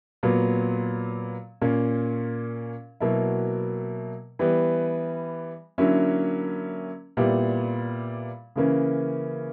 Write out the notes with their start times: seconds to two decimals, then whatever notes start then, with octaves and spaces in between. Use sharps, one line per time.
0.23 A#2 F#3 B3
1.61 A#2 A#3 C#4
3.00 B2 F#3 A#3 E4
4.39 E3 G3 B3
5.78 D3 F#3 A#3 C#4 E4
7.17 A#2 G3 B3 E4
8.56 C#3 E3 A#3 C#4